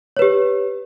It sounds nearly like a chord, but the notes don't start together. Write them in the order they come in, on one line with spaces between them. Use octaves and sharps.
C#5 B4 G4